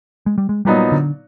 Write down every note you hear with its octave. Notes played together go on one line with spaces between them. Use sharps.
G#3
G3
G#3
A#2 F#3 G3 B3 D#4
D3